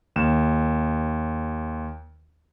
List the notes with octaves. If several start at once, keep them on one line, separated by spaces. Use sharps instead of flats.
D#2 E7